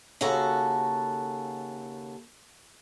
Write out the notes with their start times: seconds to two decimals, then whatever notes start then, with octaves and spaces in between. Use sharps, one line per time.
0.21 D#2 C#3 F#4 A4 A#5